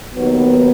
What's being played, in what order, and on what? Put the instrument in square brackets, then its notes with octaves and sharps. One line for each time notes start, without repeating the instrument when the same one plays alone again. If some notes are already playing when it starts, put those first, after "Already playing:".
[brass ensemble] D#2 D#3 F#3 B3